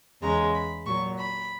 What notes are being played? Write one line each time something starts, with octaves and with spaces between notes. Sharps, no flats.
E2 C#3 G#3 A#5
B5
A#2 F#3 C#6
B5